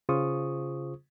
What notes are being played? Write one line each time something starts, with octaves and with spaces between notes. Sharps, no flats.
C#3 F4 G#4 C5 C#6 D#6